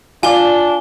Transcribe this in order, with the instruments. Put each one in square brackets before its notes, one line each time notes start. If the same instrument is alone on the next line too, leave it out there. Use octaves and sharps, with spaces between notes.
[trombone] D4 [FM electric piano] F4 D5 [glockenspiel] G#5 G7